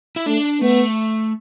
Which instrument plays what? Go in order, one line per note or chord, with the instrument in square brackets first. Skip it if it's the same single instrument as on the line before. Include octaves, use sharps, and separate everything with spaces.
[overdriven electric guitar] E4
[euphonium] A3 [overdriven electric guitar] D4
[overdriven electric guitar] A3 [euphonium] B3